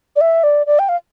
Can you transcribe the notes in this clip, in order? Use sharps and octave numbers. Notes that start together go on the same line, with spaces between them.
D5
E5
D5
D5
G5
F5